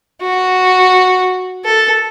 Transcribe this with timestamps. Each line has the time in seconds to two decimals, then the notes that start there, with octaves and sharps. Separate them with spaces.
0.22 F#4
1.65 A4